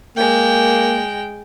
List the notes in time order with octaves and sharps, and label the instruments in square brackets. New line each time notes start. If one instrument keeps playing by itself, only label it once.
[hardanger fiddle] G#3 G5 [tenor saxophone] A#3